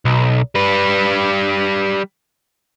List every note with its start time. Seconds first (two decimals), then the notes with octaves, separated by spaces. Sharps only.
0.05 B1
0.55 G3 B4